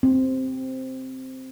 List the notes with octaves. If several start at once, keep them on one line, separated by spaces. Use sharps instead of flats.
C4